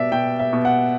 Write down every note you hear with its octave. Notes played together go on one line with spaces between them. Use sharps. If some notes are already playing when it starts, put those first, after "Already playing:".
Already playing: B2 D5 E5
B2 G5
E5
B2
F#5